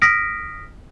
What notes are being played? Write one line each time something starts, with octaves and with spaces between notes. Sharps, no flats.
D#6 F6 A#6 B6 D7